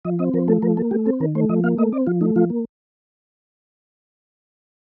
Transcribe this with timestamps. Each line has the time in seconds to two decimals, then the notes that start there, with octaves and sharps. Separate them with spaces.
0.05 F3 D#5
0.19 C4 D#5
0.33 F3 A#4
0.48 A3 A4
0.62 F3 A#4
0.77 A#3 A4
0.91 A3 G4
1.05 C4 A4
1.20 D#3 A#4
1.35 A3 C5
1.49 F3 D#5
1.64 A#3 F5
1.77 A3 D#5
1.92 C4 D5
2.07 F3 F4
2.21 A3 D#4
2.36 F3 F4
2.50 A#3